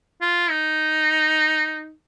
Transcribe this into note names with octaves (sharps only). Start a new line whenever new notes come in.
F4
D#4